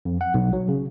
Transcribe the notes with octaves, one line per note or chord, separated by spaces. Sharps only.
F2
F#5
B1
F#3
C#3